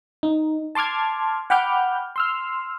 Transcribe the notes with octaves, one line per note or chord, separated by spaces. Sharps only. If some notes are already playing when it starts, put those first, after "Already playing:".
D#4
A5 C6 D6 F6 G#6
F#5 G5 B5 D6 F6 G6
C6 E6 F6